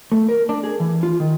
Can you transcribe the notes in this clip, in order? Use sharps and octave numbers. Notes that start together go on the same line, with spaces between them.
A3
A#4
D4
G#4
E3
F4
D#3